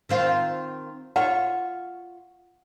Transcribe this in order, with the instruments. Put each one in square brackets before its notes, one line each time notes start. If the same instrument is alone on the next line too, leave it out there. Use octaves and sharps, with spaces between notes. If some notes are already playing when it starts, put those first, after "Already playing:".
[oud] D#3 C4 F4
[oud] F4 C#5 [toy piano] F#5